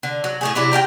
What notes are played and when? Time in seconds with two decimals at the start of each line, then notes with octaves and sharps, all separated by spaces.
0.03 D3
0.24 F#3
0.41 A2 A3 G#4
0.55 C3 F#3 D4 E4
0.72 G4 A#4 F5 G5